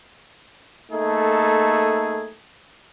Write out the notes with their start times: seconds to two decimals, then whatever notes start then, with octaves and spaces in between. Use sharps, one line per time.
0.92 A3 A#3 D#4 G#4 A4